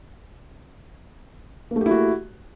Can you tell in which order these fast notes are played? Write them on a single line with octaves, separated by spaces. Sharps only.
A#3 A3 G4 E4 F#4